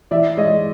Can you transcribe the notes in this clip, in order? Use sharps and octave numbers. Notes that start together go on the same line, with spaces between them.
E3 D5 E5
G#3 C#5 D#5